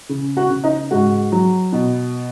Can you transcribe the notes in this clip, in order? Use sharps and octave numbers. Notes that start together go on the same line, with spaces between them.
C#3
F#4
C#3
D#4
G#2 F#4
F#3
B2